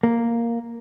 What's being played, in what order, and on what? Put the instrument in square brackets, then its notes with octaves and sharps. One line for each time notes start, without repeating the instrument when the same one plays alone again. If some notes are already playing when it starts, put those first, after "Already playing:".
[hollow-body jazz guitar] A#3